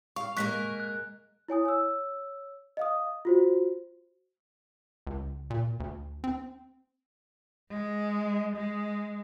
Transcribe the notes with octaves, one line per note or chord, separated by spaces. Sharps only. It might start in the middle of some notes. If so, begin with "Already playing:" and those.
F5 C#6
G#3 A#3 A#4 C#6 F#6 B6
F#6
E4 C#5 G#5 D#6
C#5 E6
D#5 F5 D#6
F4 F#4 C5
C#2
A#2
D2
C4
G#3
G#3